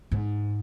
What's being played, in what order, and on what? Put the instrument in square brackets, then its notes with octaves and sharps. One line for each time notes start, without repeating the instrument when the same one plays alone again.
[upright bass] G#2